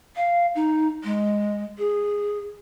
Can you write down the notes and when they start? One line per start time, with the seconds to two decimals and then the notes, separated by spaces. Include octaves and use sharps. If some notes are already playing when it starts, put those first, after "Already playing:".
0.16 F5
0.55 D#4
1.04 G#3
1.78 G#4